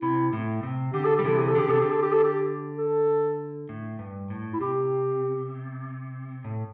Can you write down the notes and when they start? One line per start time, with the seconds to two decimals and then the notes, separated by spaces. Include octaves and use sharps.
0.02 C3 E4
0.33 A2
0.63 C3
0.94 D3 G4
1.05 A4
1.16 G3 G4
1.24 C3 E3 A4
1.38 G4
1.48 A4
1.55 D3 G4
1.68 C3 A4
1.81 D3 G4
1.91 A4
2.02 G4
2.12 A4
2.24 G4
2.78 A4
3.69 A2
3.99 G2
4.30 A2
4.53 E4
4.61 C3 G4
6.44 A2